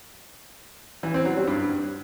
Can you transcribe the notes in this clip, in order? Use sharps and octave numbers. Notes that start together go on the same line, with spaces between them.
E3
C4
F#3
G3
G2